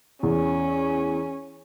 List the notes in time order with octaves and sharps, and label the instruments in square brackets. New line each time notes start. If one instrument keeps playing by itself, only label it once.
[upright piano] E2 [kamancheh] C#4